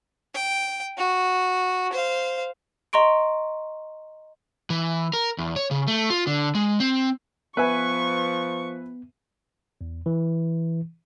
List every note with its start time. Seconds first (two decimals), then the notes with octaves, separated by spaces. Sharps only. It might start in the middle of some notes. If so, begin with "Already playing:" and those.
0.34 G5
0.97 F#4
1.93 C5 F5
2.93 D#5 A#5 C6 C#6 D7
4.70 E3
5.13 A#4
5.38 E2
5.56 C#5
5.71 C#3
5.88 A3
6.10 F4
6.27 D3
6.55 G#3
6.80 C4
7.57 F3 B3 B4 E5 G#5 C#6
9.81 E2
10.06 E3